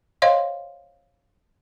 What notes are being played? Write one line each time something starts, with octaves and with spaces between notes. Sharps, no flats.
C5 C#5 D#5 F5 C6